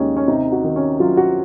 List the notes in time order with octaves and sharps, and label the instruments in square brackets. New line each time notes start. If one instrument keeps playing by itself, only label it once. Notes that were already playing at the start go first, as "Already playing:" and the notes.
Already playing: [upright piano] D#2 C#3 G#3 C#4 D#4
C#4
C3 D#4
F#4
D#3
C#4
F#3 F4
F#4